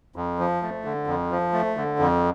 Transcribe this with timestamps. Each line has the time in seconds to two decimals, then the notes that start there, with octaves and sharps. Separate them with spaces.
0.16 F2
0.39 F3
0.62 A3
0.85 D3
1.07 F2
1.31 F3
1.53 A3
1.77 D3
1.99 F2